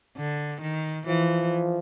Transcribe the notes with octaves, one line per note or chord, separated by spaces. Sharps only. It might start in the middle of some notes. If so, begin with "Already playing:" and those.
D3
D#3
E3 F3